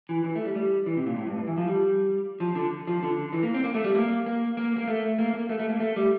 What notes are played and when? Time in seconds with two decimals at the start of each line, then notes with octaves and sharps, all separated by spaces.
0.09 E3
0.24 E3
0.35 A3
0.45 G3
0.55 G3
0.86 E3
0.97 C3
1.07 A#2
1.16 A2
1.27 G2
1.38 G2
1.47 E3
1.58 F3
1.68 G3
2.40 F3
2.55 D3
2.87 F3
3.03 D3
3.33 E3
3.43 A#3
3.54 C4
3.64 A#3
3.74 A3
3.84 G3
3.95 A#3
4.26 A#3
4.57 A#3
4.77 A#3
4.88 A3
5.19 A#3
5.34 A#3
5.49 A3
5.60 A3
5.70 A#3
5.80 A3
5.96 G3